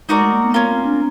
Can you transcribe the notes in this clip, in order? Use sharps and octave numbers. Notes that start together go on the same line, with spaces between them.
G#3 D#4 F#4 A#4 D5
A3
A#3
B3
B3 C#4 F4 A#4
C4
D4